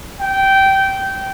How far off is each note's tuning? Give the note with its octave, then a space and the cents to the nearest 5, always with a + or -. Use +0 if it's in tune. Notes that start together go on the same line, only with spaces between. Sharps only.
G5 -15